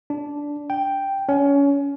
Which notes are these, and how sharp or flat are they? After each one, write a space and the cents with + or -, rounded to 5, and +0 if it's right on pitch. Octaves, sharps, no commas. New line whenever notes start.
D4 -10
G5 +0
C#4 +25